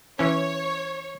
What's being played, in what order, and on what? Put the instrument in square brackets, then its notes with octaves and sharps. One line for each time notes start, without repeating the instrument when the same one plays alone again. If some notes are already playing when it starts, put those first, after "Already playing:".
[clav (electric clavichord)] E3 C#4 [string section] C#5